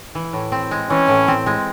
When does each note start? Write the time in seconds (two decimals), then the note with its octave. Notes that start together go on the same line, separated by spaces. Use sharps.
0.15 E3
0.33 A2
0.52 C4
0.71 G#3
0.90 E3 C#4
1.08 A2
1.28 C4
1.46 G#3